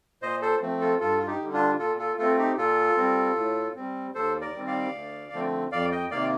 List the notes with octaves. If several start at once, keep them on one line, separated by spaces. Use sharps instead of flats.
A#2 C5 D#5
A4 C5
F3 A3 C4
F4 A4
G2 F4 A4
F4
D#4 G4
D3 G3
D4 F4
A#2 F4 A4
F4 A4
A3 C4 F4 A4
D#4 G4
A#2 F4 A4
G3 C4
A2
G3 C4
D#2 A4 C5
A#4 D5
D#3 G3 C4
D5 F5
D2
D3 F3 A3 C4
F2 D5 F5
D#5 G5
C3 D#3 A#3 D5 F5